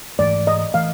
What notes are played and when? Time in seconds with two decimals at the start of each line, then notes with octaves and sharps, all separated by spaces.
0.19 G#2 E3 A3 D5
0.47 D#5
0.74 E3 A3 F5